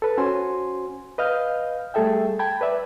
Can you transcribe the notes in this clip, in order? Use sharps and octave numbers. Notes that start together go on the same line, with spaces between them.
A4 B4
C#4 F#4 C5 G#5 C6
B4 D#5 F5 F6 G6
G3 A3 G#4 A4 E5 G5
G5 A5 B5 G#6
B4 D5 E5